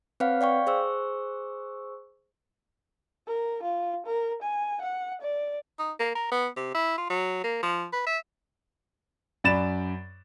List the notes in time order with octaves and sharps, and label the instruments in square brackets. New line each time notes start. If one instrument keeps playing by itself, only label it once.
[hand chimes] C4 B4 C#5 F5 F#5
D5 F5 G5 C#6
G#4 C5 C#6 E6
[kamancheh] A#4
F4
A#4
G#5
F#5
D5
[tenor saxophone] D#4
A#3
A#4
B3
C3
E4
F4
F#3
A#3
F3
B4
E5
[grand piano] F#2 D5 B5 A6 E7